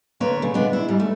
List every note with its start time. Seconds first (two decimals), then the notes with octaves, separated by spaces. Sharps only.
0.20 F2 D3 A#3 B4 C#5
0.42 A#2 C#3
0.54 G#3 B3 D4
0.73 E4
0.88 G#2 G3
1.00 A3